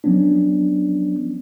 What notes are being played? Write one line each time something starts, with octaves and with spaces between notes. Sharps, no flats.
F3 F#3 B3 C#4 D4